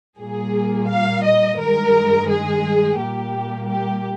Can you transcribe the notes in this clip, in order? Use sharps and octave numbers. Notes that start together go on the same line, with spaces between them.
A#2 G3 A#3 G#4
F5
D#5
G2 D#3 G#3 A#4
G#4
A#2 G3 A#3 G4
G4